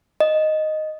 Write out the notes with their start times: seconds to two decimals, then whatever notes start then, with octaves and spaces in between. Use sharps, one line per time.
0.20 D#5